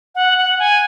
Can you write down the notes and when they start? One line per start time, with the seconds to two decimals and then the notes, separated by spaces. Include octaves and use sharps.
0.15 F#5
0.38 F#5
0.59 G#5